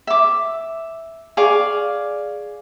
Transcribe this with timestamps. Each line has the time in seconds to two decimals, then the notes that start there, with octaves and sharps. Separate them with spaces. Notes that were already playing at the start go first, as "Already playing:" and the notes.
0.07 E5 D6
1.37 G#4 D5 F5 C#6